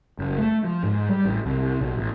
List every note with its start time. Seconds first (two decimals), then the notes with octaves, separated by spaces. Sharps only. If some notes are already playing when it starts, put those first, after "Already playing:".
0.19 F#1
0.38 A3
0.64 F3
0.83 G#2
1.09 G3
1.25 A1
1.46 C2
1.81 B1
1.97 A1